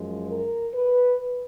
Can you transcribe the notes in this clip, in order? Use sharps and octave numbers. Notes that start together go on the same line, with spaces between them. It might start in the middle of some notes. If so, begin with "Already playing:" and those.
Already playing: F#2 F3 G#3
A#4
B4